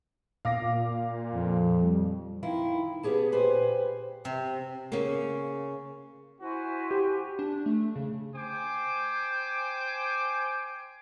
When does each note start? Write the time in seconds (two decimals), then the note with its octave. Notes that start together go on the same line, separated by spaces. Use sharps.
0.45 A#2 F5 D6 A#6
1.34 F2
1.83 G3
2.43 D#3 E4 F4
3.03 B3 C#4 G4 G#4 A5
3.32 A#2 G4 B4 C5 G#5
4.25 C3
4.92 C#3 A#3
6.41 E4 F#4 C5 G#5
6.91 G4
7.39 D4
7.66 A3
7.95 C#3
8.35 C5 G5 G#5 D6